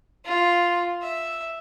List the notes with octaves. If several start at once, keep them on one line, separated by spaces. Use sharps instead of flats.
F4
E5